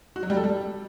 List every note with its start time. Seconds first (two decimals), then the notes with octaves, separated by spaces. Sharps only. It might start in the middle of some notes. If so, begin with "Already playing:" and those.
0.16 F#4
0.23 F#3
0.30 G3
0.37 A4
0.44 G3